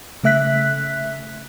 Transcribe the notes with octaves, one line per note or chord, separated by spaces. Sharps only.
C#3 A3 E5 F#6 B6